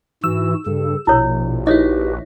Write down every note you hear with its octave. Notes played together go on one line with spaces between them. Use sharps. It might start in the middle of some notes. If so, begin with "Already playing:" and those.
G#2 E3 F#4 E6
G2 C#3 A4
A#1 B2 E4 C#5
D#4 E4 F#4 G4 B4 C#5 D#5